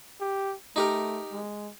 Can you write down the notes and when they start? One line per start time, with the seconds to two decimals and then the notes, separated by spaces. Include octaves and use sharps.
0.20 G4
0.76 A3 D#4 G4 A#4
1.32 G#3